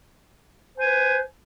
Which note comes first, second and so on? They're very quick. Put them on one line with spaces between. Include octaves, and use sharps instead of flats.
C5 G#5 B4